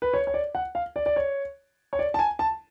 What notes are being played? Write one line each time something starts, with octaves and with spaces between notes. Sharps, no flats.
B4
C#5
C#5
D5
F#5
F5
D5
D5
C#5
C#5
D5
A5
G#5
A5